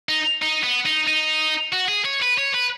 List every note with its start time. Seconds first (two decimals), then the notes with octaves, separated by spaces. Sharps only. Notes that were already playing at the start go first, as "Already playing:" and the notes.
0.09 D#4
0.42 D#4
0.63 B3
0.85 D#4
1.07 D#4
1.73 F#4
1.88 G#4
2.05 C#5
2.22 B4
2.38 C#5
2.54 B4